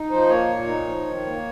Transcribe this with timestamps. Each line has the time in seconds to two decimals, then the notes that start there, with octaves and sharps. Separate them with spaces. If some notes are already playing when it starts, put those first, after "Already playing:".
Already playing: D#4
0.10 F3 C5
0.29 A#3 C#5
0.48 A#2
0.67 D#4
0.87 F3
1.06 D#3
1.26 A#3